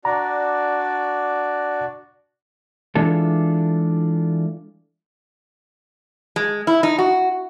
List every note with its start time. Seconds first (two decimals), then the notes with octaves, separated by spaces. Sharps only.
0.05 D4 F#4 D5 A#5
2.95 E3 G#3 D4 F4 A4
6.36 G#3
6.67 E4
6.83 D#4
6.98 F#4